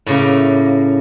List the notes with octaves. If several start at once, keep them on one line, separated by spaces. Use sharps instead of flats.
A2 C#3 A#3